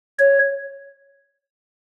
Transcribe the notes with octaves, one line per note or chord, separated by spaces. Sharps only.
C#5